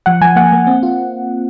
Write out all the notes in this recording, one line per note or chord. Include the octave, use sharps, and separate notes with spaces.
F3 F#5
F3 G#5
A#3 F#5
A#3
C4
F4